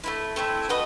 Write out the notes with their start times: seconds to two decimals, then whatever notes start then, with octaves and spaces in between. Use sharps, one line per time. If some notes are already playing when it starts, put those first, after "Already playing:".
0.04 A3 C4 E4
0.36 A3 C4 E4
0.69 F#4 B4 D#5